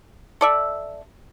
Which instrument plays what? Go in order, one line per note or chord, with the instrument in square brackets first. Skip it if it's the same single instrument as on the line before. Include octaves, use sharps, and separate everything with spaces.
[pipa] A4 D5 E5